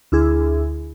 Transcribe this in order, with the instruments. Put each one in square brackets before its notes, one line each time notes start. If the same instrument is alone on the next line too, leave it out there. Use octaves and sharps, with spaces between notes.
[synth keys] D2 E4 G#4